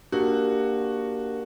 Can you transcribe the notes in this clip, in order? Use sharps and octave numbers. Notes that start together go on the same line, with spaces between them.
A#3 D4 F#4 G4 A#4